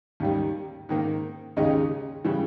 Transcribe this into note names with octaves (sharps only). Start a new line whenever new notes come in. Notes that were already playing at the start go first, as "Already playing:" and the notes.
D#2 D#3 G3
G#2 D#3 A#3
D#2 C#3 G#3 D#4 G4
C#3 E3 G3